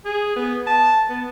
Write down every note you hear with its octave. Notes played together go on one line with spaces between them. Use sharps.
G#4
B3
A5
B3